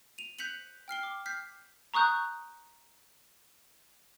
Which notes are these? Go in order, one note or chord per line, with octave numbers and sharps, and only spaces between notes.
D#7 F7
F#6 G6 B6 C#7 F7 F#7
G5 F6 C7 G7
D6
F6 G6 B6 C7
A#5 C#6 D#6 F#6 G6